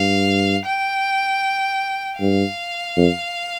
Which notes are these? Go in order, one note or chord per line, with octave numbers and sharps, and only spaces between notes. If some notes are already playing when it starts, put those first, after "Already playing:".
Already playing: G2 F5
G5
G2 F5
F2